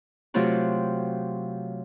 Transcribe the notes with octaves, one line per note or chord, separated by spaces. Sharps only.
C3 F#3 A3 C4 F4 F#4